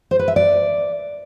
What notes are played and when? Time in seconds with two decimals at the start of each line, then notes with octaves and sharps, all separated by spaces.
0.11 C5
0.19 B4
0.28 E5
0.36 D5